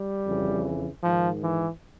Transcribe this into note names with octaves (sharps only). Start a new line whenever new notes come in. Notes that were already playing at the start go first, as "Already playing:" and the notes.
Already playing: G3
F2 C#3 E3
G#2 D#3 F3
E3